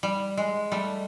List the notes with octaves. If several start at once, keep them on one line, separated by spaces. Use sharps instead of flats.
G3
G#3
G3 A3